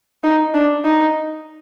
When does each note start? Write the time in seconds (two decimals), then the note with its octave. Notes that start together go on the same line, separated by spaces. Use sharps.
0.23 D#4
0.54 D4
0.84 D#4